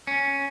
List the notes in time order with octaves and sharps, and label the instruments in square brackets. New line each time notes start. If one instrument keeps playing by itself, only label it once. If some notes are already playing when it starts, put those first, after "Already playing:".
[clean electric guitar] C#4